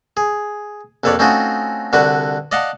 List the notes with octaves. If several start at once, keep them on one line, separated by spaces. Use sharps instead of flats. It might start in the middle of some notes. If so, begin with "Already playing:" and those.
G#4
A#1 F2 A4 B4 C#5 D5
A3 C4 C#4 D#4 F4 F#4
C2 D3 D4 F#4 B4
D5 D#5 F5 F#5 A5